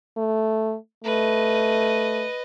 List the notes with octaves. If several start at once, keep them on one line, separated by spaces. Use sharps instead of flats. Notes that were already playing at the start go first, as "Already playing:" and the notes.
A3
A3 B4 D#5